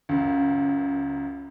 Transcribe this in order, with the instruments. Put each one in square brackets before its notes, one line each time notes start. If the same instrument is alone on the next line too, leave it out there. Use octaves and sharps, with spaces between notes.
[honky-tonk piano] C#2 F#2